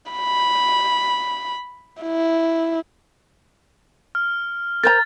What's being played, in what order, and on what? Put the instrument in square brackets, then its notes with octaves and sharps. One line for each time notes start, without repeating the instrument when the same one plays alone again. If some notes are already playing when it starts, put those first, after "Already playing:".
[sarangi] B5
E4
[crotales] F6
[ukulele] A#4 C5 A#5 [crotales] A6